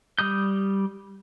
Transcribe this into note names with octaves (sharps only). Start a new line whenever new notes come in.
G3 D#6 G6